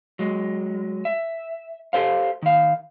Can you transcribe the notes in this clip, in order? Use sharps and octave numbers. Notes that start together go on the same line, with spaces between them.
F#3 G#3
E5
G4 A4 C5 F5
D#3 F5